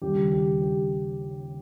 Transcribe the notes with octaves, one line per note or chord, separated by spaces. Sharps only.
D#2 C#3 G3 G4
G4
G4